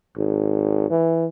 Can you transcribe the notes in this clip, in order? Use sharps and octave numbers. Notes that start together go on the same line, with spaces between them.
G#1
E3